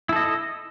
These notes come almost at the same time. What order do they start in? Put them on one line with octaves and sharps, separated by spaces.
E4 A4 D#5